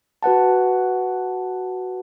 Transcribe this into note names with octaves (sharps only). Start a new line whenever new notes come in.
F#4 B4 F#5 A5